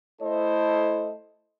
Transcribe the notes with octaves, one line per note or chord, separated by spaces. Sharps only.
A3 E4 A4 C5 D#5